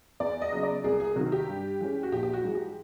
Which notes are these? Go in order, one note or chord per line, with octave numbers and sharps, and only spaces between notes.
E2 D5
D#5
C#3 F#3 B3
D5
C2 G#4
G#4
C3 D#3 F#4
G4
G2
E3 G#3 C#4
F#4
A#1 G4
G4
F#4
G#2 E3
G4